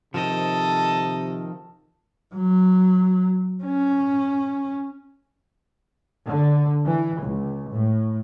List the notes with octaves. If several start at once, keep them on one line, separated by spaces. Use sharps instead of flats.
C3 D#3 F3 A4 D#5
F#3
C#4
D3
E3
C#2
A2